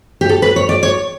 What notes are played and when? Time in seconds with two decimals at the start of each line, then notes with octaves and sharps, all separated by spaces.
0.21 G4
0.29 A4
0.42 B4
0.56 C#5
0.69 D5
0.83 C#5